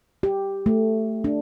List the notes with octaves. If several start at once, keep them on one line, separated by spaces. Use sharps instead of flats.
G4
A3
D4